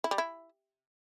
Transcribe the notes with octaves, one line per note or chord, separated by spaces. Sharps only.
E4
G3
E4